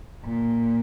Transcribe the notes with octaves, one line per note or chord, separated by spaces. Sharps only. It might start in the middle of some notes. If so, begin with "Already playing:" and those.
A#2